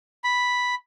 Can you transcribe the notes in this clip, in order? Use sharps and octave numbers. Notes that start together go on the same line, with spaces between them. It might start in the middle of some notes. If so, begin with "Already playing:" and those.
B5